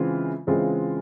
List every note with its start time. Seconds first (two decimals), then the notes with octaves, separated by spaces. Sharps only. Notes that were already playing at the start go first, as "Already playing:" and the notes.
Already playing: C#3 E3 G#3 C4 F4
0.47 C#3 E3 G#3 C4 F4